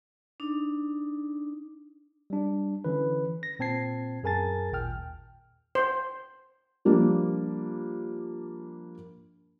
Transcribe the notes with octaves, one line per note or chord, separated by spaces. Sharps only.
D4 D#4
G3 D4
D3 E3 C#4 B4
A#6
A#2 C4 A5 G#6 C7
F#2 G#4 A#4 G#5 A5 A6
G#1 D#2 A#2 G5 F6
C5
F3 G3 A#3 D4